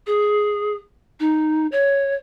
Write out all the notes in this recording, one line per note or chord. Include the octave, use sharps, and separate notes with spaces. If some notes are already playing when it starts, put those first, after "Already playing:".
G#4
D#4
C#5